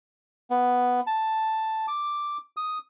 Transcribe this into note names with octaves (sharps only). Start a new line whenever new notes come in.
B3
A5
D6
D#6